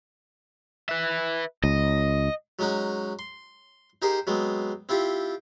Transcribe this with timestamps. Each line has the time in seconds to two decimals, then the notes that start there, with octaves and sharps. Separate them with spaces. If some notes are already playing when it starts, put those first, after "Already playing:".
0.89 B4 E5
1.64 C#2 D#5
2.59 F#3 G#3 C#4 D#4 F#4
3.19 C6
4.02 D#4 G4 G#4 A#4 C5
4.27 F#3 G#3 B3 C4
4.89 C4 E4 F4 G4